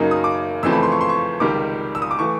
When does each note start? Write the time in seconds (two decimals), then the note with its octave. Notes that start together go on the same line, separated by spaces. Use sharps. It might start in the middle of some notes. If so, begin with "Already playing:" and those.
Already playing: F#2 C#3 F#3 A#3 D#4
0.11 D#6
0.24 D6
0.63 F2 C#3 E3 A3 C4 E6
0.73 B5
0.83 C6
0.92 C#6
1.01 C6
1.09 C#6
1.40 C#2 C3 D#3 G3 D6
1.95 E6
2.02 D#6
2.11 D6
2.19 E3 A3 C#6